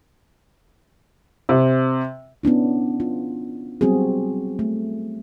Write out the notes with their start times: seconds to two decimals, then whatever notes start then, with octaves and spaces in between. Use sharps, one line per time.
1.49 C3
2.43 B3 C#4 D4 E4
3.00 F4
3.81 F#3 G3 B3 C4 F#4 G#4
4.59 A3